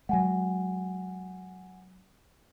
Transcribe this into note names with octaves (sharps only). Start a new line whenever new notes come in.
F#3 G#3 F#5 G#5